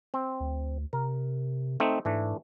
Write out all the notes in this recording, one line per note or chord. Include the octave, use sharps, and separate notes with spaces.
C4
D2
C3 A#4
A3 C4 D#4
G#2 E3 A3 D4